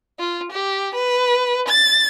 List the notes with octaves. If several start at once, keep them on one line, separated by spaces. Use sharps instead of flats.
F4
G4
B4
A6